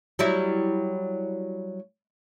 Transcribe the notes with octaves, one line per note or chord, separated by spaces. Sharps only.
F#3 G3 E4